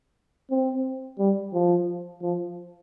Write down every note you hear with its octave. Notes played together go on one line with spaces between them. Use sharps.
C4
G3
F3
F3